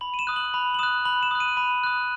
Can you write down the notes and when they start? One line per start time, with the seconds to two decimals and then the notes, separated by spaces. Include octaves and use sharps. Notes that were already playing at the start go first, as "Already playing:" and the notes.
0.01 B5 F#7
0.14 D#7
0.19 E7
0.27 D#6 F#6
0.36 F#7
0.54 B5
0.74 F#7
0.79 D#6 F#6 E7
1.05 B5 F#7
1.23 E7
1.31 D#6 F#6
1.40 D#7
1.57 B5 D#7
1.84 D#6 F#6